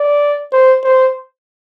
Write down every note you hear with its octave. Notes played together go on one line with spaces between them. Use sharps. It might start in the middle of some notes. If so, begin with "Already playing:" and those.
Already playing: D5
C5
C5